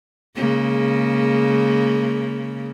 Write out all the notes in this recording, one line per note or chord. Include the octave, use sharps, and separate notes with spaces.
C#3 G#3 A#3